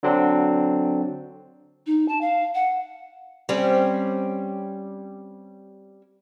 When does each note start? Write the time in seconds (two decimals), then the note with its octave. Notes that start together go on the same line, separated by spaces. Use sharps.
0.03 D3 F#3 C4 D4
1.86 D#4
2.08 A5
2.21 F5
2.55 F#5
3.49 G3 C4 C#4